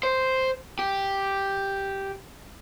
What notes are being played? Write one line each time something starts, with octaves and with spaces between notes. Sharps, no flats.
C5
G4